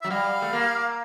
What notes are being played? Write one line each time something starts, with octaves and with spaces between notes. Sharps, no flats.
F#3 E5
G3 F5
A3
A#3